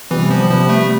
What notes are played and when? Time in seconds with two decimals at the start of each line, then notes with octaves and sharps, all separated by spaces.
0.10 C3 E3 G3 B3
0.31 F3
0.50 C3 F3 G3 B3
0.69 A3